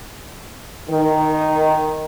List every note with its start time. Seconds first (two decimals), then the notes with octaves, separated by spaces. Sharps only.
0.89 D#3